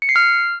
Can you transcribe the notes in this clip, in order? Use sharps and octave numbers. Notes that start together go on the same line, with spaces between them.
C#7
C7
F6